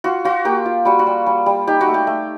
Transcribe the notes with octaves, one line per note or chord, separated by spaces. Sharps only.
F4 F#4
F4 F#4
A#3 G4
F4
G3 F#4
F#4
G3
G3
G3
D#4 G4
F#4
A3
G4
A3